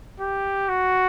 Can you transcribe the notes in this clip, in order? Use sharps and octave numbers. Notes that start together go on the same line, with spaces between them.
G4
F#4